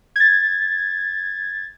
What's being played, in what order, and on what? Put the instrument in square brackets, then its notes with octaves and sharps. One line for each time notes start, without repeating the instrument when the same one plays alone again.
[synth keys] G#6 A6